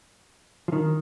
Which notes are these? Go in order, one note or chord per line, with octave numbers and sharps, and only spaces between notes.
F3
D#3